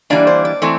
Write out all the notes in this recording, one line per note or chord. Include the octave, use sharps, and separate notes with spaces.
E3 G3 A#3 D4 D5
C5
D5
E3 A3 C4